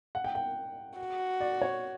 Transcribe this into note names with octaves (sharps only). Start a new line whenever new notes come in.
F#5
G5
G5
F#4
D5
C#5